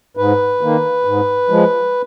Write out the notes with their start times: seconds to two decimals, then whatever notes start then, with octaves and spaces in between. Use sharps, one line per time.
0.17 G#2 B4
0.61 D#3 A#3
1.05 G#2
1.49 F3 G#3